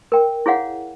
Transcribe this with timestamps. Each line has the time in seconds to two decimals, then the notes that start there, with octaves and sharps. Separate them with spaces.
0.12 A#4 G5
0.46 E4 G#4 C#5 F5 F#5